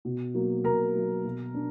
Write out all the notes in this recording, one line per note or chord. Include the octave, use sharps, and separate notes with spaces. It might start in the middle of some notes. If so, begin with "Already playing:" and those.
B2
F#3 A#3
B2 A#4 A#5
F#3 A#3
B2
D4